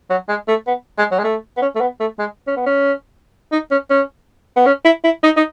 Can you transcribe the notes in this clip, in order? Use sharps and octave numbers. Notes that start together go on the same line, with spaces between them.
F#3
G#3
A3
B3
G#3
F#3
G#3
A3
B3
C#4
A3
B3
A3
G#3
C#4
B3
C#4
D#4
C#4
C#4
B3
C#4
E4
E4
D#4
D#4